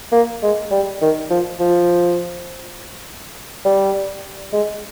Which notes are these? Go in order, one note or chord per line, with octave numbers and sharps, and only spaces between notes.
A#3
G#3
G3
D#3
F3
F3
G3
G#3